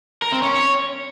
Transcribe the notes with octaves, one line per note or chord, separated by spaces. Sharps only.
A#4
C4
C#4
C#5